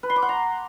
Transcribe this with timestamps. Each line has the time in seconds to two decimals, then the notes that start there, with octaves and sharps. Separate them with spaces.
0.03 B4
0.10 C6
0.16 D6
0.22 F#5
0.29 A#5